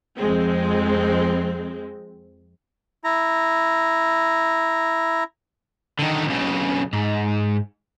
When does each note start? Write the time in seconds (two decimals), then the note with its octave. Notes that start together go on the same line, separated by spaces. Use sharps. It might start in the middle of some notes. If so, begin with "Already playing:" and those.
0.17 F2 G#3 C4
3.04 E4 A#5
5.99 D3 D#3
6.27 B1 C#3
6.93 G#2